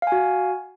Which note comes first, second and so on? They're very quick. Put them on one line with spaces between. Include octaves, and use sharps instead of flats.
F5 G#5 F#4